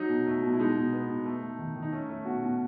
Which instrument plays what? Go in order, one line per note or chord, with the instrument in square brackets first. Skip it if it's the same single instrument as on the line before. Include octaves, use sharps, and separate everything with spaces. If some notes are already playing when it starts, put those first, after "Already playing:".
Already playing: [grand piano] F#3 D#4
B2
A3
B2
E4
G#3 D#4
B2
B3
B2
A3
A3
D#3
D#3
D#4
A3 C#4
A3
B2 F#4
B2